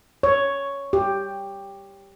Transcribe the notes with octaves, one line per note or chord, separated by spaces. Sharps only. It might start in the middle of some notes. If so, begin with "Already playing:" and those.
C#5
G4